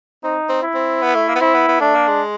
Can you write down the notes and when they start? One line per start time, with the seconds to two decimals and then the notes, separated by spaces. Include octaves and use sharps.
0.24 C4 D#4
0.49 C4
0.63 E4
0.75 C4
1.02 B3
1.15 A3
1.29 A#3
1.35 B3
1.41 C4 E4
1.54 B3
1.68 B3
1.81 A3 D4
1.95 A#3
2.08 G#3